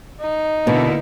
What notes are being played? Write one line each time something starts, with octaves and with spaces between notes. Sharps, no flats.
D#4
B2 D3 A#3 E4